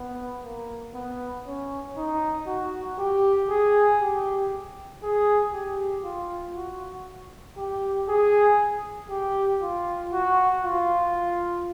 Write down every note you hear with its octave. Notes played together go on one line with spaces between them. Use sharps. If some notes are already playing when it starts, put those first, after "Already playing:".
Already playing: B3
A#3
B3
C#4
D#4
F#4
G4
G#4
G4
G#4
G4
F4
F#4
G4
G#4
G4
F4
F#4
F4